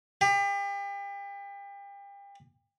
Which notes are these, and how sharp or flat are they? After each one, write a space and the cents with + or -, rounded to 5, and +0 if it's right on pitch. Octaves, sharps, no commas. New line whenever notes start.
G4 +35